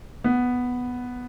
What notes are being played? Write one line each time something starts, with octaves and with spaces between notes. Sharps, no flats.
B3